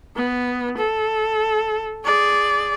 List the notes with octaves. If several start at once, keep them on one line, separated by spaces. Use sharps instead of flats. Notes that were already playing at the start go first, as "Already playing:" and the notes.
B3
A4
G#4 D5